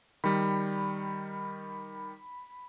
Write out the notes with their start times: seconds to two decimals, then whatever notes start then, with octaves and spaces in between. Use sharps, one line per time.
0.24 D#3 G3 B5